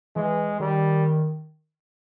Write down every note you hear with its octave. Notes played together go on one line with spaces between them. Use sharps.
E3 G#3
D#3 G3